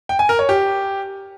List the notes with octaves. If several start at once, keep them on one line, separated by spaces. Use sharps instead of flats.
G5
G#5
A#4
C#5
G4